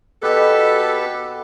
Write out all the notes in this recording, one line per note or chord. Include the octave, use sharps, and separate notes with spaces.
B2 G4 A4 B4